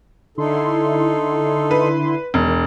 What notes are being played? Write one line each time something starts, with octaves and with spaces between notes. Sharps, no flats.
D3 D#4 E4 A4 C6
B4
E1 D#3